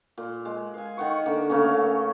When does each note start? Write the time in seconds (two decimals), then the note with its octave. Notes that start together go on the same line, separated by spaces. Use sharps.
0.18 A#2
0.45 G#3
0.74 F5 G#5
0.97 D#3 F#5 C#6
1.26 D3 A#3
1.49 C#3 A3 A#3 C#4